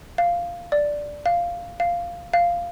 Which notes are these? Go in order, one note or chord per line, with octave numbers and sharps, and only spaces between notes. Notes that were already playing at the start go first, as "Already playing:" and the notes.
F5
D5
F5
F5
F5